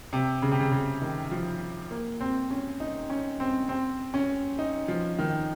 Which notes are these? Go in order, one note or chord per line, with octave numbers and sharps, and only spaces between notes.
C3
C#3
C3
C#3
C#3
D#3
F3
A#3
C4
C#4
D#4
C#4
C4
C4
C#4
D#4
F3
D#3